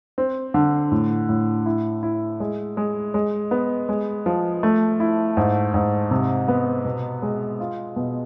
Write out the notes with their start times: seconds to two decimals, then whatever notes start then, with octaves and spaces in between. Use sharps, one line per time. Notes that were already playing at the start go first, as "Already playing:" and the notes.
0.18 C4
0.54 D3
0.92 A2
1.29 A2
1.66 E4
2.03 E4
2.40 G#3
2.77 G#3
3.14 G#3
3.51 B3
3.89 G#3
4.26 F3
4.63 A3
5.00 E4
5.37 G#2
5.74 G#2
6.11 C3
6.48 B3
6.85 B2
7.22 G#3
7.60 F4
7.96 B2